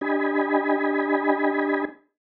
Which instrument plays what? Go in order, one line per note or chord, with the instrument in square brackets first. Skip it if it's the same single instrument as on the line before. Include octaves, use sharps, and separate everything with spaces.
[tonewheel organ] D4 G4 D#5 G#5 B5